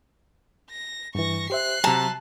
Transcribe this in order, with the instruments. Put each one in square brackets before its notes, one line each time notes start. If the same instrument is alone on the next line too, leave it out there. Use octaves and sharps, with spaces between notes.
[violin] A#6
[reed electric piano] G2 E3 [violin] C#6 A#6
[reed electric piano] G4 C5 E5 [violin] F#6 C7
[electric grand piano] C3 A#5 [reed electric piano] F#3 [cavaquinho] A5